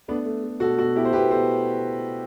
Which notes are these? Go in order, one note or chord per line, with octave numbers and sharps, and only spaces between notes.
A3 B3 D4
A3
A3
B2 F#4 A4
B2 F#4 A4
B2 E4 G4
C5
B2 G4 B4
B2 A4 C5